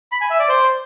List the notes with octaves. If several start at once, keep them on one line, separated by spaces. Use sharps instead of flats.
B5
G#5
E5
D5
C5